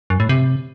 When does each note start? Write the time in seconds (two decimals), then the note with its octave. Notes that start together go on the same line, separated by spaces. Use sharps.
0.10 F#2
0.20 A2
0.29 C3